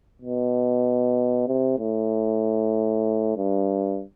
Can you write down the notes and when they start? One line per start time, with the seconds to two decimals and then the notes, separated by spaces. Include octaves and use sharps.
0.22 B2
1.48 C3
1.79 A2
3.37 G2